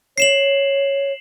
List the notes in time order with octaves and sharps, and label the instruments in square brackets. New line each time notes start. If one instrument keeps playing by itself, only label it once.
[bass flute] C#5 [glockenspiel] C7 E7 F#7